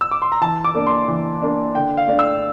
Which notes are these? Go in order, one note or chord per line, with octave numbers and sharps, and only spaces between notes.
E6
D6
C6
A#5
E3 A5
D6
A#3 D4
C6
E3
A#3 D4
D3 G5
F5
A3 D4
E6